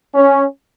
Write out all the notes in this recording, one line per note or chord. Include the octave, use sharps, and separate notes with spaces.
C#4